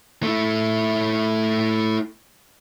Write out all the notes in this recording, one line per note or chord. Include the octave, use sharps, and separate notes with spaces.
A3 E4